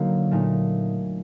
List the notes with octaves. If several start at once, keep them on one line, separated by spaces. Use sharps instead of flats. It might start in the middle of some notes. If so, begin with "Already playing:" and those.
Already playing: D3 F#3 A#3 D#4
A#2 A3 D#4